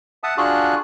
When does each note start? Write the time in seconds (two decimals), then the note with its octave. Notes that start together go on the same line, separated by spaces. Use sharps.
0.23 E5 F#5 A5 D#6
0.38 D4 F4 F#4 G#4 F#6